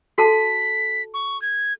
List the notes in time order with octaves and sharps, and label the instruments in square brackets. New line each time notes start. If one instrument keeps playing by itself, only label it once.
[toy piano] F#4 A4 A5 [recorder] B6
[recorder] C#6
G#6